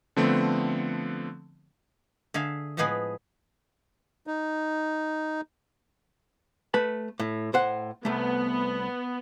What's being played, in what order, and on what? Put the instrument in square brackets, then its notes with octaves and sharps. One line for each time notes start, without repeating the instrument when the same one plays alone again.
[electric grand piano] D3 F3 A3 B3 C4
[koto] D3 G#4 E5 F5
A2 F3 G#3 B3 G#4 B4
[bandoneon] D#4
[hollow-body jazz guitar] A3 B4 A5
A2
A2 C5 F#5
[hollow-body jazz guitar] C2 A3 [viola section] B3